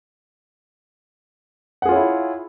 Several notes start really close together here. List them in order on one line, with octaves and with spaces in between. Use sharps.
F#5 G#4 F4 C#5 E4